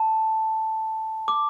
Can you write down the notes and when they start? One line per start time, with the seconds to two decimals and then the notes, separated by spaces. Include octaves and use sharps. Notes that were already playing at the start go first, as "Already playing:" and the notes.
Already playing: A5
1.28 D6